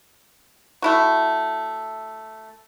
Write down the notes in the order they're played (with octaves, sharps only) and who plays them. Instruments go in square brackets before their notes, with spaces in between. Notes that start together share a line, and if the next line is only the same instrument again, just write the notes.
[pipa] A3 E4 F#4